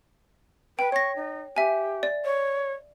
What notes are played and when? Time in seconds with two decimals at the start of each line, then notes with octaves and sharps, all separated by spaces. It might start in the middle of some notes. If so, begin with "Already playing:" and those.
0.79 B4 G5
0.92 C#5 C#6 A#6
1.16 D#4
1.56 G4 E5 G#5
2.03 D5
2.25 C#5